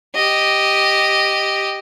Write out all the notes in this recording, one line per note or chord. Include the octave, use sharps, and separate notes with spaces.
G4 D#5